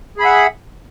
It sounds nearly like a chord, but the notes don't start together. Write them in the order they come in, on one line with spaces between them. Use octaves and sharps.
G#4 B5 E5 F#5